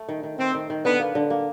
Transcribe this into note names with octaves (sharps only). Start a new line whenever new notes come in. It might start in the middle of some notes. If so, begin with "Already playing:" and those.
Already playing: A3
D#3
D#3
D#3 C4
D#3
D#3
D3 B3
A#3
D3
A#3